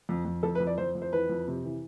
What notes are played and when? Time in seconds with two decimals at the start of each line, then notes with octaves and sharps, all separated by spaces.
0.09 F2
0.25 F2
0.43 F2 A4
0.55 B4
0.60 F2
0.67 D5
0.78 F2 C5
0.95 F2
1.02 C5
1.12 E3 B4
1.30 F2
1.48 C3
1.64 E3